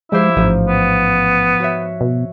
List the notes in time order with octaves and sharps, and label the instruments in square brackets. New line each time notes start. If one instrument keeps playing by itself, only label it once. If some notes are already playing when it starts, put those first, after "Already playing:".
[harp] F3 G4 C5 [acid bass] G#3 [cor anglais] E4
[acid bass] A1 [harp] G#2 F3
[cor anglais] B3
[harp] F#4 C#5 E5
[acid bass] B2